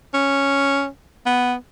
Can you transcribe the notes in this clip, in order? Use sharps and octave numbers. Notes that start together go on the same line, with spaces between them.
C#4
B3